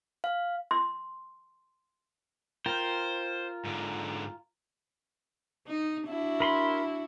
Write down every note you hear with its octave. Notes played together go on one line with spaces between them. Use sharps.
F5
C6
F4 A#4 C5 G5
G#2 D3
D#4
D4 E4 F#4
A#4 B5 C6